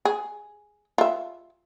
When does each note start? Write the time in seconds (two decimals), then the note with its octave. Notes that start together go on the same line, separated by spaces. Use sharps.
0.05 G#4
0.98 F4 E5